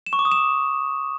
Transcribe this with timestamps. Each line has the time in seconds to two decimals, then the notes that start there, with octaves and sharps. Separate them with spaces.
0.06 E7
0.13 C#6
0.19 D6
0.25 D#6
0.31 E7